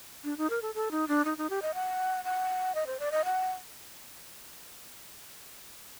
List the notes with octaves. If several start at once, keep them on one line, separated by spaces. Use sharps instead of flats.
D4
D#4
A#4
A4
A4
D#4
D4
D#4
D#4
G4
D#5
F#5
F#5
D#5
C5
D5
D#5
F#5